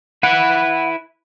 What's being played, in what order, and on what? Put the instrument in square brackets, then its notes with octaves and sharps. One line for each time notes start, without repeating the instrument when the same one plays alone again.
[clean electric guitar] E4 B4 [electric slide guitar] F#5